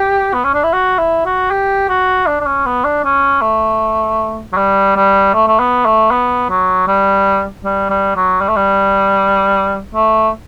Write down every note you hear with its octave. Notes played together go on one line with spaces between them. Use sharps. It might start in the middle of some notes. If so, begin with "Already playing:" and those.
Already playing: G4
B3
C#4
D4
E4
F#4
E4
F#4
G4
F#4
D4
D4
C#4
B3
D4
C#4
A3
F#3
G3
G3
A3
A3
B3
A3
B3
F#3
G3
G3
G3
F#3
G3
A3
G3
A3